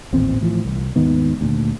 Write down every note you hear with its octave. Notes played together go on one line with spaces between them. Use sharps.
A1 D#2 A#2 C4
A2 E3 F3
C2
D#2 G#2 D#3 B3
D2 A#2